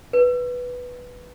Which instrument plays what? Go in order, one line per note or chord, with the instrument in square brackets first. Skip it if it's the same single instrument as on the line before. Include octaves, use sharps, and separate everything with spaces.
[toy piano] B4